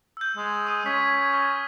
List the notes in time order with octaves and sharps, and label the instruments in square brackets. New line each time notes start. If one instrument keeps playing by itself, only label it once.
[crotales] E6 G6
[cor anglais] G#3
[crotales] C#6 D#6 D#7
[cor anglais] C#4 [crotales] G#6 B6
[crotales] C#6 F6 A#6